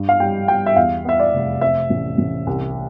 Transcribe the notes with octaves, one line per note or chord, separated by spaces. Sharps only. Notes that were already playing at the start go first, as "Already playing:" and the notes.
Already playing: G2
F5
G3 G5
G3 G5
E5
E2 F5
B3 E5
D5
F1
C4 E5
A1
A1
C2